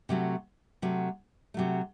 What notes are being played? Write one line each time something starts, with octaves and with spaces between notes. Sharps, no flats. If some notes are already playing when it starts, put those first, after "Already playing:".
C3 F#3 A3
C3 F#3 A3
C3 F#3 A3